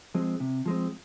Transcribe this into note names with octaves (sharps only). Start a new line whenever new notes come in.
F3 G#3 C4
C3
F3 G#3 C4